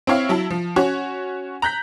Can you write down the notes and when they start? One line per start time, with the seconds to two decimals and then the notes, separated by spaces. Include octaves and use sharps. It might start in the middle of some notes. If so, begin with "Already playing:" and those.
0.07 C4 E4 C#5 F5
0.29 F#3 E4 E5 A5
0.50 F3
0.76 C#4 F#4 C#5
1.62 A#5 F#6 G6 B6